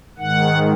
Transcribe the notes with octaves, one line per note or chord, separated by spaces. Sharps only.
G#2 D#3 F#5